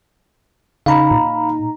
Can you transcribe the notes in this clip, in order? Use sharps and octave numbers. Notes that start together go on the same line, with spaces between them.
C#3 D#4 F5 A#5 B5
A#2